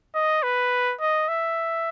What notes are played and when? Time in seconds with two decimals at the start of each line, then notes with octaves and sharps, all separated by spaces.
0.15 D#5
0.43 B4
1.00 D#5
1.28 E5